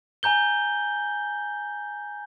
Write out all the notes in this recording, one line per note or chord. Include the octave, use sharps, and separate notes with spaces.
G#5 A#5 G6 G7